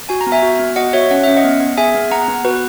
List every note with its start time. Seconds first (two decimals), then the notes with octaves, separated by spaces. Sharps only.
0.09 F#4 G#5
0.21 A#5
0.27 B3
0.32 E5 G#5
0.42 F#4
0.59 B3
0.76 F#4 D#5 F#5
0.93 F#4 C#5 E5
1.11 C#4 F#5
1.24 C#4 E5
1.37 D#5 F#5
1.44 B3
1.60 B3
1.77 G#4 E5 G#5
1.95 B3
2.10 B3 F#5 A#5
2.28 B3
2.45 F#4 B4